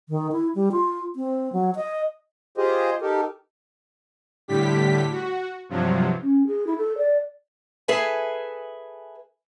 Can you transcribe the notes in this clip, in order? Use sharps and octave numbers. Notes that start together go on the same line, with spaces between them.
D#3
E4
G3
F4
C4
F#3
D#5
F4 G4 G#4 C5 D#5
D#4 G4 A4 A#4
A2 D3 G3 G4 B6
F#4
G2 C3 F3 F#3
C#4
G#4
E4
A4
D5
G#4 A4 B4 E5 G#5